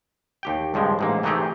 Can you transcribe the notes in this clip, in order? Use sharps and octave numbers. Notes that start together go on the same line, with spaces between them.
D#2 G4 G5
C#2 G2 F3 G#3
A1 G#2 A#3
C3 E3 A3 D#4 G4 G#4